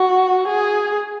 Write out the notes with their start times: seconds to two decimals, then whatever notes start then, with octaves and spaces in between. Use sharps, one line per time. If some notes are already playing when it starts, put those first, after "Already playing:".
Already playing: F#4
0.48 G#4